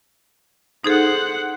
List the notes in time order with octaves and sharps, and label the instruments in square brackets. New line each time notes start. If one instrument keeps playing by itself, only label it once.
[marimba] D#4 G#4 A4 [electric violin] C5 F#5